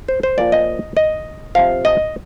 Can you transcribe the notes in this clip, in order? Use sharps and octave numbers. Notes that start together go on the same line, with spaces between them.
C5
C5
A#2 F3 D5
D#5
D#5
C3 F3 F5
D#5